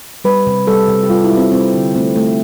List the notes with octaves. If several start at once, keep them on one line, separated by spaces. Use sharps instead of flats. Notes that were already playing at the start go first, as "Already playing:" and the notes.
G3 B4
C3
G3 A4
C3
G4
G3 F4
E4
G3
C4
G3 C4
D3
A3 C4
A3